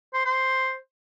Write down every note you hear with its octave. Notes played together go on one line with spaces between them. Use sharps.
C5
C5